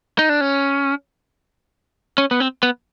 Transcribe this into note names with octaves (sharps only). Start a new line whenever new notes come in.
D#4
D4
C#4
C#4
B3
C4
B3